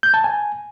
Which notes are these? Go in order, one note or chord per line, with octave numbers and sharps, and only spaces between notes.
G6
A5
G#5